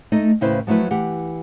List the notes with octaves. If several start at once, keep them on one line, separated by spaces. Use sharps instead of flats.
A3 D#4 D#5
D#2 A2 C#3 E4 B4 C5
F3 F#3 A3 E4 B4
E3 G4 F#5